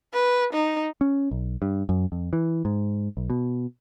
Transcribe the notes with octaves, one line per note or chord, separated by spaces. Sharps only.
B4
D#4
C#4
B1
G2
F#2
F2
E3
G#2
B1
B2